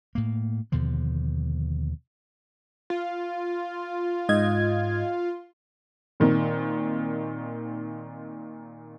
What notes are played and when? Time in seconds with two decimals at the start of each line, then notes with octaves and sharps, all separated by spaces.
0.15 A2 A#3
0.72 D#2 B2 D3 F3
2.90 F4
4.29 G#2 D#5 G#6
6.20 A#2 D#3 C4